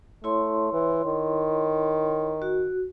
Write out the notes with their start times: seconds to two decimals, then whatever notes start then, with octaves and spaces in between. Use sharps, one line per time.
0.24 A3 E4 C#5 C6
0.73 E3
1.05 D#3
2.42 F#4